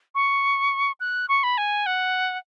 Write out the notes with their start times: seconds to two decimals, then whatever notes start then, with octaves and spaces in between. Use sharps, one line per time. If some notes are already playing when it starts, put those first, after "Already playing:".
0.15 C#6
1.00 F#6
1.29 C#6
1.43 B5
1.58 G#5
1.86 F#5